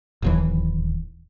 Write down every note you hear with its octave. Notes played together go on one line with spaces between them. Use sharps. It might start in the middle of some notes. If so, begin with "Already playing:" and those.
D1 D#2 E3